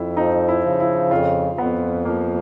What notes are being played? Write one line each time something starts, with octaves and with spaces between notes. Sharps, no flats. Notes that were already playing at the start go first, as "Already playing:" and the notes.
Already playing: F2 E4
F3 D#4
E4
C#3
E4
F2 F4
F2 B3
F3 A#3